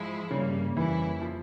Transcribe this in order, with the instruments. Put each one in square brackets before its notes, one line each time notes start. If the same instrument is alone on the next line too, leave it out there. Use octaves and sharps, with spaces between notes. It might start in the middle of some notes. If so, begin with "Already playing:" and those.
Already playing: [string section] G#2 F3 G#3 E4
[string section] G2 G3 A#3 [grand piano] C#3
[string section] F2 C#3 G3 A#3 E4 [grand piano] E3
[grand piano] F3